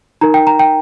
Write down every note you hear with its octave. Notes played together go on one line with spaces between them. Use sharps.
D#4 A#4 A#5
G5
A#5
G5